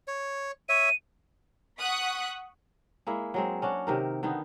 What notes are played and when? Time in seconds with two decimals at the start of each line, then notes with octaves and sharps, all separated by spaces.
0.08 C#5
0.69 C#5 E5 D#7
1.79 F#5 C#6 D#6 F#6 B6
3.07 G#3 A#3 E4
3.34 F#3 G#3 C4
3.62 C#4 D4 F#4
3.87 C3 D#3 A#4
4.23 D3 D#3 B3 D#4